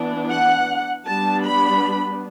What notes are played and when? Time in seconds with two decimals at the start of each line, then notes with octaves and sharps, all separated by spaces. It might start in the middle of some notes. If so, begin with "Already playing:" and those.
Already playing: E3 B3 D4
0.30 F#5
1.06 G3 B3 D4 A5
1.44 B5